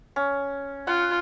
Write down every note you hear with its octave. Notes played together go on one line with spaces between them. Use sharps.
C#4
F4 F#5